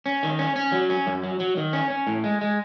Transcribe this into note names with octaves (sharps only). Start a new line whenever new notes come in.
C#4
D#3
C#4
C#4
F#3
C#4
F#2
F#3
F#3
D#3
C#4
C#4
A2
G#3
G#3